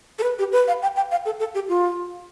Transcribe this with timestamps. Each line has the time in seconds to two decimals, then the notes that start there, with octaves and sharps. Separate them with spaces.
0.19 A4
0.23 B4
0.39 G4
0.52 B4
0.68 F5
0.82 G5
0.96 G5
1.11 F5
1.26 A4
1.40 A4
1.54 G4
1.69 F4